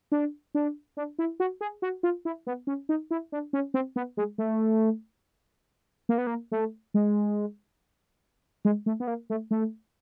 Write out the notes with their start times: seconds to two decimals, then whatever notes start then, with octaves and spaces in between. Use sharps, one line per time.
0.12 D4
0.55 D4
0.97 D4
1.19 E4
1.40 F#4
1.61 G#4
1.82 F#4
2.03 F4
2.25 E4
2.47 B3
2.67 C#4
2.89 D#4
3.11 E4
3.32 D4
3.53 C#4
3.74 C4
3.96 B3
4.17 G#3
4.38 A3
6.09 A#3
6.18 B3
6.27 A#3
6.52 A3
6.94 G#3
8.65 G#3
8.86 A3
9.00 B3
9.07 A#3
9.30 A3
9.51 A3